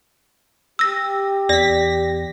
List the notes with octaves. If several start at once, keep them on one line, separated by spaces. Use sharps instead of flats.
G4 E6 A#6
E2 D5 A#6 B6